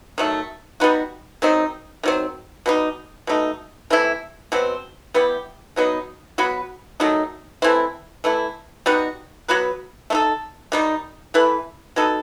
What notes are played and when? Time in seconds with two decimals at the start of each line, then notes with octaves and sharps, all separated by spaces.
0.18 D#3 F#3 A3
0.80 G3 B3 D#4 F#4
1.42 D#3 F#3 C4 D#4
2.03 D#3 F#3 C4
2.66 B2 G3 D#4
3.27 B2 A3 D#4
3.90 C3 E3 A3 E4
4.52 B2 F#3 C4
5.14 G3 B3 E4 G4
5.76 B2 F#3 B3 D#4
6.38 F#3 B3 F#4 B4
7.00 D#3 F#3 A3 D#4
7.62 E3 A3 C4 E4
8.24 E3 A3 E4
8.86 G3 B3 D#4 F#4
9.48 F#3 B3 F#4 B4
10.10 A3 D#4 A4
10.72 D#3 G3 D#4
11.34 E3 A3 E4 B4
11.96 F#3 B3 D#4 A4